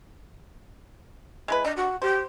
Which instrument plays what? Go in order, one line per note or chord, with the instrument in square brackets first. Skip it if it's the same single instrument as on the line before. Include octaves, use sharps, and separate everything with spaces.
[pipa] G#3 E4 B4
[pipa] D4 [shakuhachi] D#5
[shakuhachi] F#4
[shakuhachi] G4 [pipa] C5